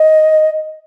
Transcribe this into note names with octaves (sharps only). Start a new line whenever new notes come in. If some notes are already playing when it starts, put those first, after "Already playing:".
Already playing: D#5